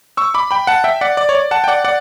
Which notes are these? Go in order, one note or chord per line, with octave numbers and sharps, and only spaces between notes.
C#6 E6
B5 D6
G5 B5
F#5 A5
E5 G5
D5 F#5
D5
C#5
D5
F#5 A5
G5
D5 F#5
D5 F#5